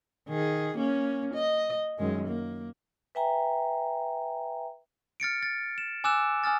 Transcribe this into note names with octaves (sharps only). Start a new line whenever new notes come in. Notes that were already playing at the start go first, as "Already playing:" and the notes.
D#3 G#4
A#3 C#4
D#5
F#2 D#3 G#3
A#3
B4 E5 G5 G#5 A#5
F6 A6 C#7 D7
A6
E7
G#5 D6 E6 F#6 E7
G#5 D#6 F6 A6